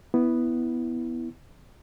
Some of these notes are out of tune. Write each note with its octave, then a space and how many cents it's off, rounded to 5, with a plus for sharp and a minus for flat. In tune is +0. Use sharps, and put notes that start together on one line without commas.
B3 +0 E4 -10